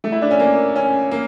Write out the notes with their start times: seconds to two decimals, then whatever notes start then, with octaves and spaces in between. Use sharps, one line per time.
0.04 A3
0.12 E4
0.22 D4
0.31 C#4
0.39 A#3
0.76 C#4
1.11 A#3